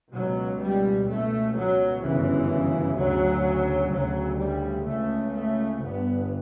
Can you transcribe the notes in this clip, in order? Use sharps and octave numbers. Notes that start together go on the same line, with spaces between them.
C#2 B2 F#3
G3
C#2 B2 A3
F#3
G1 F#2 C#3 E3
D2 C#3 F#3
D2 C#3 F#3
G3
C#2 C#3 A3
A3
G1 G2 B3